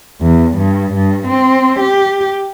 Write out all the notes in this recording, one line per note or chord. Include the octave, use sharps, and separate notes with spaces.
E2
G2
G2
C4
G4